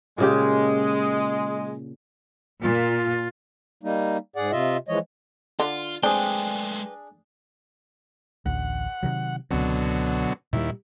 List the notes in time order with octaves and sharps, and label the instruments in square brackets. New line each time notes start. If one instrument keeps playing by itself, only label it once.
[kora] A#2 C#3 G4 [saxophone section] G#3
[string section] A#2 [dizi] F4
[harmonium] G3 A#3 D#4
G#2 G#4 D5 F#5
C3 F4 D#5 E5
E3 F3 G#3 C#5 D#5
[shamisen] D3 [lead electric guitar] F4
[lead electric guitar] G#3 A3 [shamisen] C4 [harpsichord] D4 G#4 [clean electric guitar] B4 G5
[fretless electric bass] A1 D2 [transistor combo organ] F#5
[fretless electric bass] C3 D#3 F#3
[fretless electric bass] C#2 C4 [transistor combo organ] B2 D3 F#3
[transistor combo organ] D#2 E4 [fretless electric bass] A#2 G3